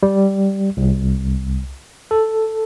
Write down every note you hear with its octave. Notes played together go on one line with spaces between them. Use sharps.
G3
C2
A4